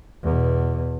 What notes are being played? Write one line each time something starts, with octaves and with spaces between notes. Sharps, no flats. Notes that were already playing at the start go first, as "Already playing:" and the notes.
E2 B2